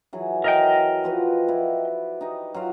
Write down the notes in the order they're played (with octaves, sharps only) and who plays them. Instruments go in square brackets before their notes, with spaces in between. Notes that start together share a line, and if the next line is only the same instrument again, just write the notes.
[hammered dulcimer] E3 F#3 G#4
[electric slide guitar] A#4 D#5 G5
[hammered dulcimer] F3 F#4 B4
E4 F#4 D5
D#4 G4 D#5
F#3 F4 F5